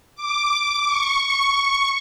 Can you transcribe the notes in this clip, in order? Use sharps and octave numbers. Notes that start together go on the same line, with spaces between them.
D6
C#6